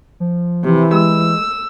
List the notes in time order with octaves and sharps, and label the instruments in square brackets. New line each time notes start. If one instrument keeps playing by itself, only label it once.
[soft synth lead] F3
[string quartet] C3 [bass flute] E3
[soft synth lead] G#3 [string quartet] E6